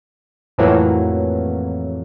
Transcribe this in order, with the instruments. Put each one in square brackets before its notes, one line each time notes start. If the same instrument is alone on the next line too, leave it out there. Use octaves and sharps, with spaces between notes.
[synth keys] F2 A2 E3 F#3 A3 A#3